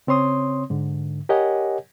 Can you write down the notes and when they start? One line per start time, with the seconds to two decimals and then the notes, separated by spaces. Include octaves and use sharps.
0.07 C#3 C4 C#5 C6 D#6
0.70 G#2 D3
1.29 G4 A#4 C#5 D#5 F#5 G#5